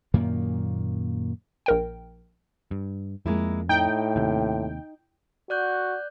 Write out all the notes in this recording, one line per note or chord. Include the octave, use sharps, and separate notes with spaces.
F#2 A#2 D#3 A#3
A#1 A#4 G5
G2
F2 G#3 A#3 E4
A2 D#4 G5
D#2 C3
F#4 D5 F#6 G6